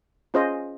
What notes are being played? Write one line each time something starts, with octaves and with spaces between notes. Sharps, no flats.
C#4 F4 G#4 C5 D#5